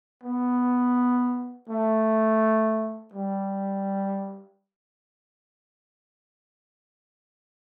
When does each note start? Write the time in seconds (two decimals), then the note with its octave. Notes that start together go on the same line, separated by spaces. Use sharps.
0.23 B3
1.69 A3
3.13 G3